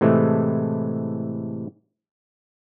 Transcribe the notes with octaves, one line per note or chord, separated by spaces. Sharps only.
A2 C3 E3 G#3 A3